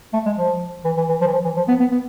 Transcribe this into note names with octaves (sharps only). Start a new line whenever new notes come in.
A3
G#3
F3
E3
E3
E3
F3
E3
F3
E3
F3
B3
B3
B3